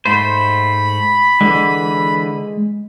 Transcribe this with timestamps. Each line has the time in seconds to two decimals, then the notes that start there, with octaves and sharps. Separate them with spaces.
0.05 G#2 A3 C5 B5
1.41 D3 E3 G#3